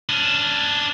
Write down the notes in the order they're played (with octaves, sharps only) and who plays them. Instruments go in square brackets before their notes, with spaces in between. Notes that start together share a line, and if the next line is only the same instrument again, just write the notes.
[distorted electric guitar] C#4 D4